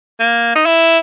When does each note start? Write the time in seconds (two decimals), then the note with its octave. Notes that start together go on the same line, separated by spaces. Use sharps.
0.20 A#3
0.56 D#4
0.66 E4